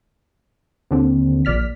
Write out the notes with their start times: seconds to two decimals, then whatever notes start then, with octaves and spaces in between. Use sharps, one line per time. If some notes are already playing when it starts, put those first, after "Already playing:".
0.91 D#2 D3 C4
1.45 A#1 D5 F6 B6